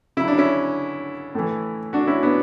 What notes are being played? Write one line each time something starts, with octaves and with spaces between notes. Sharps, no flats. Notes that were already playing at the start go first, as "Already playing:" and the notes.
C#3 F#3 E4
D4
C#4 E4
A2 E3
D4 F#4
C#4 E4
B3 D4